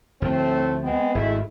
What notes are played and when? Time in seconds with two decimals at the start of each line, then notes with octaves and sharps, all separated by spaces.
0.22 D2 A2 F3 A3 C4
0.82 G#3 B3 C4
1.15 G#1 G#3 A3 E4